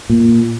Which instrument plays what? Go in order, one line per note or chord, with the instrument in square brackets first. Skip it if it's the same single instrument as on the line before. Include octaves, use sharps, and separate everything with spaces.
[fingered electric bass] A#2